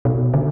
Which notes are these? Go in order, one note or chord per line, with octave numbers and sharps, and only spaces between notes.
B2
D3